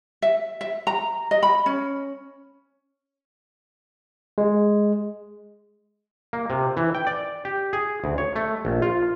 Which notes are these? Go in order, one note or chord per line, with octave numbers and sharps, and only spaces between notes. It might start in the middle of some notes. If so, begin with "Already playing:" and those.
E5
E5
A#5
D#5
B5
C#4
G#3
A#3
C3
E3
G5
D5
G4
G#4
D2
C#5
A3
A#1
F4